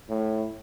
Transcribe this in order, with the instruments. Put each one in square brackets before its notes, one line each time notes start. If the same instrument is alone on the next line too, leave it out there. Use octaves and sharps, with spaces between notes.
[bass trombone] A2